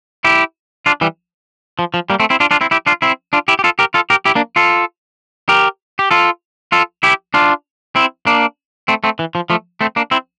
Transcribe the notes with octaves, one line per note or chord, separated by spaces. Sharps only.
E4 G4
D4 F4
E3 G3
F3
F3
G3 A#3
A3 C4
C4 E4
D4 F4
D4 F4
C4 E4
E4 G4
D4 F4
C4 E4
D4 F4
E4 G4
G4
F4 A4
G4 A#4
F4 A4
G4 A#4
E4 G4
A#3 D4
F4 A4
G4 A#4
G4
F4 A4
F4 A4
E4 G4
D4 F4
C4 E4
A#3 D4
A3 C4
A3 C4
E3
F3
F3 A3
A3 C4
A#3 D4
C4 E4